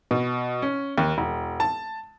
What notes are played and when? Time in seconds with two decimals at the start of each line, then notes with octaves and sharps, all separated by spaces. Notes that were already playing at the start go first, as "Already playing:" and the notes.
0.11 B2
0.62 C#4
0.98 D#2
1.18 E1
1.60 A5